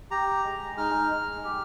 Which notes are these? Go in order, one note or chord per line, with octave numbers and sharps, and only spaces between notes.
G4 A#5
G#3
D#4 F6
G#3
G4